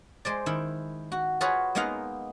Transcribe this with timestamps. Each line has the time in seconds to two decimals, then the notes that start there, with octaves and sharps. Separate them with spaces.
0.25 G#3 C5 D5
0.46 D#3 E4
1.12 F#4
1.41 F4 F#4 G#4 B4 C#5
1.75 G#3 A#3 B3 D#4 F5 F#5